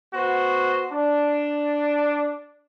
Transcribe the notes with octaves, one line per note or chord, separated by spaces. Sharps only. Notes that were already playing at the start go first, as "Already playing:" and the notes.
B3 F#4 C5
D4